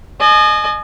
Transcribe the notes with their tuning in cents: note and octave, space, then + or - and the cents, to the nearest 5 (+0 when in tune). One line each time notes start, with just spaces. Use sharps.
D#5 -30 G#5 +35